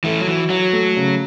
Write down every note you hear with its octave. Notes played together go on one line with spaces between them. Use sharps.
E3 A3 A4
F#3
E3 F#4
F#3 F#4
A3
C#3